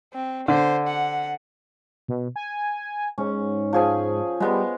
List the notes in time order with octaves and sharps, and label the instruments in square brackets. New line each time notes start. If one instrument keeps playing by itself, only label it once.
[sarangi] C4
[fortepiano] D3 [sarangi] C5
[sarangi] F#5
[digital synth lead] B2
G#5
[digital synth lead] G#2 [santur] C#4
[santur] F3 G#4 G#5
[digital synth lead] G3 [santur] G#3 B3